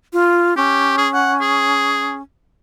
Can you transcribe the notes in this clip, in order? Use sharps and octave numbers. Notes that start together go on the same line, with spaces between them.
F4
C#4 G4
G#4
F#5
G#4